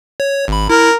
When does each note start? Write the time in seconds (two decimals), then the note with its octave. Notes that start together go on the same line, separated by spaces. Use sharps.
0.20 C#5
0.48 G#1 B5
0.70 E4 A#4